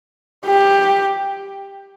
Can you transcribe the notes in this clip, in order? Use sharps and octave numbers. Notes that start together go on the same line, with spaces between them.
G4